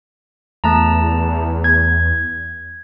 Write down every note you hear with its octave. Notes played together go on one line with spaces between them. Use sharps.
E2 A3 A5 A#5
G#6